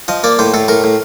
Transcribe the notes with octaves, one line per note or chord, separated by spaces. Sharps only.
F3 D#5
A#3 D5
A2 C5
A2 A4
A2 A#4
A2